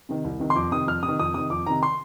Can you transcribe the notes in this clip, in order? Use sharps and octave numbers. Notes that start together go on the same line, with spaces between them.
C3 D#3
C2
C3 D#3
C6
F2 D6
C3 D#3 D#6
F2 F6
C3 D#6
D#3
F2 D#6
C3 D#3 D#6
F2 D6
C3 D#3 A#5
C6